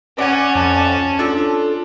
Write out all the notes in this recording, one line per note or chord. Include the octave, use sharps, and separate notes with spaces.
C#4 D5 F#5 G#5
F2 A5
D4 F4 A4